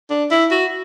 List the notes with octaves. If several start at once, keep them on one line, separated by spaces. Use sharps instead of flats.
D4
E4
F#4